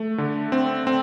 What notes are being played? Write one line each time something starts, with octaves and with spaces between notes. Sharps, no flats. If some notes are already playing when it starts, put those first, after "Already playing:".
Already playing: A3
D3
C4
C4